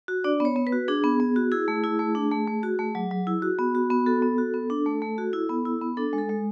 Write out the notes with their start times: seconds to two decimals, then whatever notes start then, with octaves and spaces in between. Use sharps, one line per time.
0.08 F#4
0.24 D4 D5
0.40 B3 C#5
0.56 B3
0.67 B4
0.72 F#4
0.88 D4 G#4
1.04 B3
1.20 B3
1.36 F#4
1.52 E4 G#4
1.68 A3
1.84 E4
1.99 A3
2.15 D4
2.31 A3
2.47 A3
2.63 F#4
2.79 A3
2.95 F#3
3.11 F#3
3.27 E4
3.42 F#4
3.59 B3
3.75 F#4
3.90 B3
4.06 F#4 A4
4.22 B3
4.38 F#4
4.54 B3
4.70 D4
4.86 A3
5.02 A3
5.18 F#4
5.33 E4
5.49 B3
5.65 E4
5.81 B3
5.97 D4 A4
6.13 G#3
6.18 A4
6.29 G#3